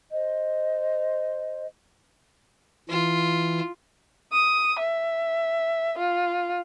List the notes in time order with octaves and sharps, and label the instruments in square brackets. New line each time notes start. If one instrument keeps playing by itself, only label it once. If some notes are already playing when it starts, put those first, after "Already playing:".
[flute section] C5 D#5
[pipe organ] E3 [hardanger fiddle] F4
[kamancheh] D#6
E5
F4